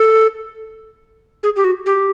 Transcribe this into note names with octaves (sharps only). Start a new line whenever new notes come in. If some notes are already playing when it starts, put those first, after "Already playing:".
Already playing: A4
G#4
G4
F#4
G4